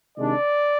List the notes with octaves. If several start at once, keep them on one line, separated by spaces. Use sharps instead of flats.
C3 D#3 G#3 D4 D5